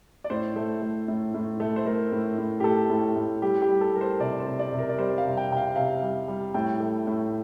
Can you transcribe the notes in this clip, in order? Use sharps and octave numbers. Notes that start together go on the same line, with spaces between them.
D5
A2 C5
A3
A3
A2
A2
A3
C5
A3 A#4
A2
A2
G4
A3 A4
A2
A4
A2
G3 G4
G4
G3
A4
G3 A#4
C5
C3 D5
C5
C3
D5
C3
A#4
D5
G3 C5
F5
C3
G5
C3 G5
F5
C3 F5
G3
G3
A2 G5
A3
A2